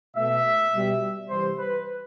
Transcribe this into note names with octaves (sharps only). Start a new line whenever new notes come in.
B2 A3 E5
B2 G3
C3 E3 G3 C5
B4